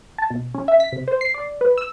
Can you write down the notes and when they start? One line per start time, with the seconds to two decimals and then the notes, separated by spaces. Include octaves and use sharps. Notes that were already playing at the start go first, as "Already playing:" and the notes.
0.18 A5
0.30 B2
0.55 C#4
0.68 E5
0.80 B6
0.92 C3
1.08 C5
1.21 C7
1.34 D5
1.61 B4
1.78 E6